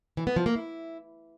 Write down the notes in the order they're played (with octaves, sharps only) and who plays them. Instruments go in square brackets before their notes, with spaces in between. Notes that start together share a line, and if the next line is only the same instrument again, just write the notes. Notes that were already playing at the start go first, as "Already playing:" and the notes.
[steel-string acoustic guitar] E3
B3
F3
A#3
E4